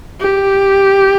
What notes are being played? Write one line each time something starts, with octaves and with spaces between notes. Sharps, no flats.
G4